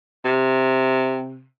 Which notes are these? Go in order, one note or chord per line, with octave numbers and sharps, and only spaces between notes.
C3